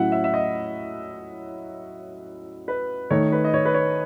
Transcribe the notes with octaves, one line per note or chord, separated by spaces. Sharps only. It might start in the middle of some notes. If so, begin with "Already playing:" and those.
Already playing: A2 F#3 C#4 E4 E5 F#5
E5
E5
D#5
B4
D#3 A3 D#4 C#5
B4
D#5
C#5
B4
C#5